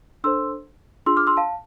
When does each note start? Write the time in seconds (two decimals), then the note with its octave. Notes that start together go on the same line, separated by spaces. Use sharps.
0.24 D4 A4 C5 C6 E6
1.06 D4 F4 G#4 C6 E6
1.17 D6 F6
1.27 C6 E6
1.37 F5 A5